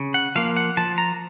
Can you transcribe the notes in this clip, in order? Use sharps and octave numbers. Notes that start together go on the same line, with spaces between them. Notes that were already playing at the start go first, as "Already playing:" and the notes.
Already playing: C#3
F#5
F3 A#3 F5
F#5
F3 A5
A#5